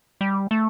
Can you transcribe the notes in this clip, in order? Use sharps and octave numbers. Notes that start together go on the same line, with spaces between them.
G3
A3